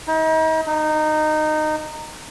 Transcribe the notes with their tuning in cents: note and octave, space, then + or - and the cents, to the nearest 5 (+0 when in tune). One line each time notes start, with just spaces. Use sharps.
D#4 +40
D#4 -15